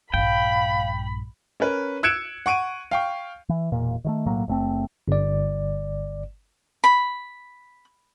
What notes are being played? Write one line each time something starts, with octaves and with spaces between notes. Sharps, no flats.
A#1 G2 F5 G5 B5
C#4 A#4 B4
E6 F#6 G#6 C#7 D7 E7
F#5 C#6 D7 D#7
F5 G5 C#6
E3
E1 A#2 A#3
D#3 F#3 A3
B1 A2 F#3 A#3
F#1 A3 C4
G1 D5
B5